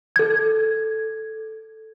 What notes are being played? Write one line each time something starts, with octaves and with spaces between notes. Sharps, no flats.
A4 G#6